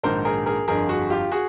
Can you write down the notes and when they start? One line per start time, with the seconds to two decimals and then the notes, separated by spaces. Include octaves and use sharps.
0.03 A#1 G#2 D#3 A#4 C5
0.25 G#4 A#4
0.46 G#4 A#4
0.68 G1 F2 D3 G#4 A#4
0.89 F#4 G#4
1.10 F4 G4
1.32 F#4 G#4